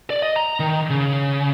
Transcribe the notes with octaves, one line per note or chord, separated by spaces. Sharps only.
D5
D#5
A#5
D#3
C#3